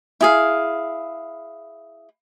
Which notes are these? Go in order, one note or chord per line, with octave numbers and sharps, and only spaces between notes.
E4 G#4 F5